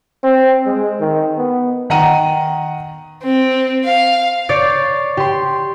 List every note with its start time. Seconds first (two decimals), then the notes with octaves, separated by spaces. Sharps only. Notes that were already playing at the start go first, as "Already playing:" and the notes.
0.24 C4
0.66 G#3
1.00 D#3
1.38 B3
1.90 D#3 F#5 A#5 D#7
3.23 C4
3.84 F5
4.49 C#5 D5 D6 G6 A6 C7
5.17 G4 C6